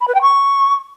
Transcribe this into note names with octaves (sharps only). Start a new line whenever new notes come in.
B5
B4
G5
C#6